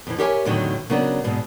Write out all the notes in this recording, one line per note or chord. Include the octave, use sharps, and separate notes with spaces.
F2 E3
G4 A#4 C#5 E5 F5 G#5
E2 A2 D3 D#3 F#3
C#3 F#3 B3 D4 A#4
E2 G#2 B2